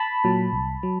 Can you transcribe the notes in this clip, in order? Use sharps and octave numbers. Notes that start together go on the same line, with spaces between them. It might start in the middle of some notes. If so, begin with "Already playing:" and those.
Already playing: A5 B5
A#2 F#3
C2
F#3